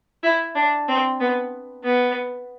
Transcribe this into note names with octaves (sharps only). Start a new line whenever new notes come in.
E4
D4
C4
B3
B3